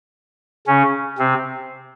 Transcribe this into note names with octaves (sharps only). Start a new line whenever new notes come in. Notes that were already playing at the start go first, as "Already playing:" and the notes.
C#3 C#4
C3 C4